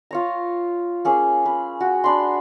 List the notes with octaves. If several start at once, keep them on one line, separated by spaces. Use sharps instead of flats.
F4 C#5 A#5
A#3 C#4 G#4
B4
F#4
D4 B5 C6